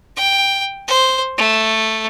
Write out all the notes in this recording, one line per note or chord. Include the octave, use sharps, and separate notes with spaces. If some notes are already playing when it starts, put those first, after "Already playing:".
G5
C5
A3